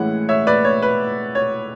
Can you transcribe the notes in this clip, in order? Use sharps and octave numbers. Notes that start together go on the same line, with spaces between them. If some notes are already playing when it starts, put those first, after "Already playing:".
Already playing: A2 E3 G#3 C#4 F#5
C#5 E5
B4 D5
C#5
B4
C#5